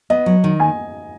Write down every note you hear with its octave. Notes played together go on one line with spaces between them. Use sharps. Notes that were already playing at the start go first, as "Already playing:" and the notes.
B3 D#5
F#3
D#3
G#5